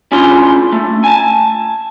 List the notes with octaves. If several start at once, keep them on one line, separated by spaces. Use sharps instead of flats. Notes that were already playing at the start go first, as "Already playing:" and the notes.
C#4 D4 F4 C6
A3
G#5 A5